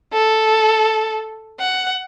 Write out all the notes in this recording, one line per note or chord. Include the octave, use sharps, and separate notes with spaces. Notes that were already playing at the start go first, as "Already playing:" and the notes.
A4
F#5